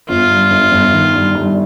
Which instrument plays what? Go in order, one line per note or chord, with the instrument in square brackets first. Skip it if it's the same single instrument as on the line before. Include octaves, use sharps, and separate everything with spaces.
[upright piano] G1 [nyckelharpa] F4
[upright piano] G2
G1
G1
D#3
G2
G2